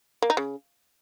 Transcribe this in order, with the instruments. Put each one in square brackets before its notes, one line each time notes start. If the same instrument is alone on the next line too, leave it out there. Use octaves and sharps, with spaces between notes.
[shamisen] A#3
D#4
C#3